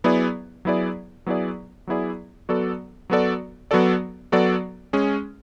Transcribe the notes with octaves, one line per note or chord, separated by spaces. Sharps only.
F#3 B3 E4 G#4 D5
F#3 B3 E4 G#4 D5
F#3 B3 E4 G#4 D5
F#3 B3 E4 G#4 D5
F#3 B3 F#4 A4 D5
F#3 B3 F#4 A4 D5
F#3 B3 F#4 A4 D5
F#3 B3 F#4 A4 D5
G#3 C#4 G#4